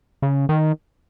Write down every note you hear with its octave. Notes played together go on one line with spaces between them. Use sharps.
C#3
D#3